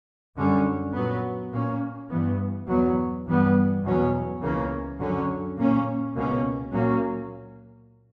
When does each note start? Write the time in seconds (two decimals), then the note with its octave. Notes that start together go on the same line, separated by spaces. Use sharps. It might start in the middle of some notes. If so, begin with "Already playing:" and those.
0.36 F#2 D3 G3 C#4
0.94 A#2 F#3 B3
1.52 A#2 A#3 C#4
2.10 G2 E3 B3
2.67 E2 B2 F#3 B3
3.26 G2 E3 G3 B3
3.83 E2 B2 F#3 C#4
4.41 C#2 C#3 E3 A#3 C#4
4.99 F#2 D3 F#3 C#4
5.57 A#2 A#3 C#4
6.14 C#2 B2 A#3 C#4
6.72 A#2 F#3 A#3 C#4